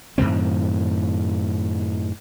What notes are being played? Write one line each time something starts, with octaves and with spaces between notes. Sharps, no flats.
F#2 A2 D#3 C4